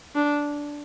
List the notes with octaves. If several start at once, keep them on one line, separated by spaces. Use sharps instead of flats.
D4